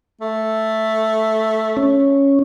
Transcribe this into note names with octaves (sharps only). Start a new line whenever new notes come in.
A3
C#4